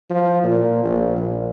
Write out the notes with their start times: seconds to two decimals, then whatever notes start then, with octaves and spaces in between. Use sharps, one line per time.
0.10 F3
0.44 A#2
0.84 A#1
1.16 A#1